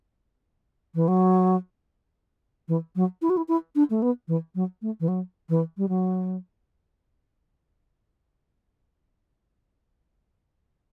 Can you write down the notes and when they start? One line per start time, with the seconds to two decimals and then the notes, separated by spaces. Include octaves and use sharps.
0.95 E3
1.08 F#3
2.68 E3
2.96 F#3
3.22 E4
3.30 F#4
3.37 E4
3.48 E4
3.75 D4
3.90 A3
4.02 B3
4.28 E3
4.55 F#3
4.82 A3
5.00 E3
5.08 F#3
5.49 E3
5.78 G3
5.89 F#3